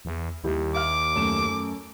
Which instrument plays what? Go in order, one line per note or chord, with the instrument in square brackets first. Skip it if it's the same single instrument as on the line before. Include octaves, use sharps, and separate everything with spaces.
[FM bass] E2
[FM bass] D#2 [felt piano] G3 E4 G4
[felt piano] E5 F5 F6 [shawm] D6
[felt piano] F#2 A3 E7